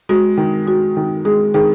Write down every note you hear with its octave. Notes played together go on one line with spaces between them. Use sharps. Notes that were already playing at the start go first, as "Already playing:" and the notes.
G#3 F#4
D#3
G#3 F#4
D#3
G#3 G#4
D#3 G#4